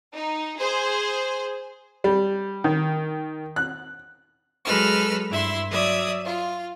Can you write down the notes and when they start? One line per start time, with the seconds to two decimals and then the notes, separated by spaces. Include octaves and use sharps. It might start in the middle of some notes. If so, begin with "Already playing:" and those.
0.14 D#4
0.59 G#4 C5
2.04 G3
2.64 D#3
3.56 F#6
4.65 F#3 G#3 A4 B4 E6 F6
5.29 G2 E4 E5 C6
5.70 F#3 D5 E5 D#6 G#6
6.26 F4